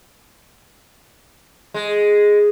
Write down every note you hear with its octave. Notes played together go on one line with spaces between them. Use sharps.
G#3